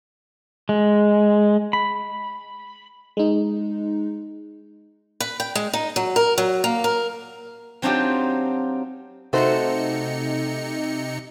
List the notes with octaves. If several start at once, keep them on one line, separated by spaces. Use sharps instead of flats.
G#3
B5
G#3 D#4
B4
G5
G#3
D#4
F#3
A#4
F#3
A#3
A#4
F#3 C4 D4 D#4 F4 G4
C3 A3 D#4 F#4 C5 C#7